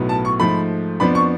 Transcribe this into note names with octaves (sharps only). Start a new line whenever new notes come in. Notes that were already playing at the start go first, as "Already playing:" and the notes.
Already playing: B1 A2 F#3 B3
A5
C#6
G#2 F3 A3 B5
F2 F3 B3 D4 B5
C#6